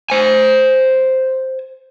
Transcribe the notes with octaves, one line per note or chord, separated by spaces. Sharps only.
C5 G#5